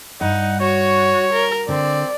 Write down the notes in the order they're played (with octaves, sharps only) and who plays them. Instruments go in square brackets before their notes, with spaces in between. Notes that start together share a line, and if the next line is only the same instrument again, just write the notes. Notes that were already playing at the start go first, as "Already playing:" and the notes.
[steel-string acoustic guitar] G2 [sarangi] D#4 [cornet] F#5
[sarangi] F#4 [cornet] C#5
[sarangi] A#4
[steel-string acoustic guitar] D3 [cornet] C4 [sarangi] D5